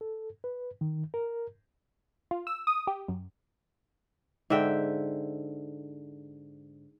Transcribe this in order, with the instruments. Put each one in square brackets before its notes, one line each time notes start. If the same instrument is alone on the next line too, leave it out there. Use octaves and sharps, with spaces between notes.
[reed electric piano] A4
B4
D#3
A#4
[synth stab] F4
E6
D#6
G4
F#2
[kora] G#2 D3 E5 G5